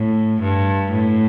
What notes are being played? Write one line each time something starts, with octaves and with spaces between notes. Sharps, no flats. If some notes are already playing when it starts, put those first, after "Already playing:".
Already playing: A2
G2
A2